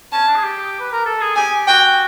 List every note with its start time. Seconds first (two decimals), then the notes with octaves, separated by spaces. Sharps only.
0.12 C#4 A5
0.28 D4
0.36 G#4
0.43 G4
0.80 B4
0.92 A#4
1.06 A4
1.21 G#4
1.36 G4 G#5
1.68 F#4 G5